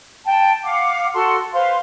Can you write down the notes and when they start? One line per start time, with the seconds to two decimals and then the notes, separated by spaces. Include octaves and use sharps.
0.25 G5 A5
0.63 F5 F#5 D6
1.13 F#4 A4 F#5 C6
1.53 B4 C5 F5 C6